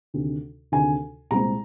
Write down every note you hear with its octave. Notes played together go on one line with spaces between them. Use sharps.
D2 C3 D#3
D2 C3 D#3 G#5
C2 A#2 G#3 C4 A#5